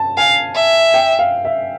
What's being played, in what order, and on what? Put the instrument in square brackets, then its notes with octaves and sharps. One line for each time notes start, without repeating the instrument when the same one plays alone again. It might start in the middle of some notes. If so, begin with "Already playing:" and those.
Already playing: [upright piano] A5
[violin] F5 [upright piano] G#5
[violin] E5
[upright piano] G5
F5
E5